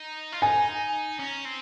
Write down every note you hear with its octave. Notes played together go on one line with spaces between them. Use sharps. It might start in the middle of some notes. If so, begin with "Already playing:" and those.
Already playing: D#4
F4
D#4 G#5
C#4
C4